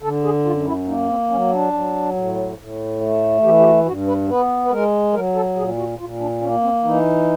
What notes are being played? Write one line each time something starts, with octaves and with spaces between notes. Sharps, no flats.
D3 A4
G#4
F#2 F4
E4
A#3 D#4
C4
F#3 C#4
D4
F#3
A2
A2
A3
E3 G4
G4
F#4
G2 F#4
B4
B3 B4
B4
G#3 A#4
F#3 A#4
A4
A#2 G#4
F#4
A#2 F4
D4
A#3 C#4
C4
E3 D#4